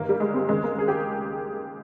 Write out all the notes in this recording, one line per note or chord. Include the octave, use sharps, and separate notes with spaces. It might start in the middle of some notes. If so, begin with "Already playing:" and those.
Already playing: G1 G2 D#3 A#3
G3
G#3
C4
D#2 C#3 G#3
A#3
G#4
G4